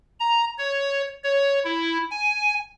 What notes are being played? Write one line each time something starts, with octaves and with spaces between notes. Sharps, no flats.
A#5
C#5
C#5
E4
G#5